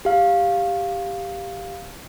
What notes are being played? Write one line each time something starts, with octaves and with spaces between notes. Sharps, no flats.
G4 F5